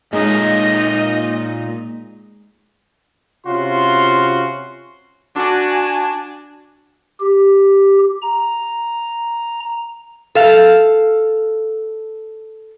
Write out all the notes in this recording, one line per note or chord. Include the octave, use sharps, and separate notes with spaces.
A#2 G#3 D#4 A#4 C#5 D#5
C3 C#4 F4 F#4 C6
D4 F#4 G#5
G4
A#5
A4 F5